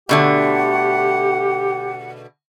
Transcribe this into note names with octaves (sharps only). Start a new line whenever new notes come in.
B2 D3 A3 G4 F#5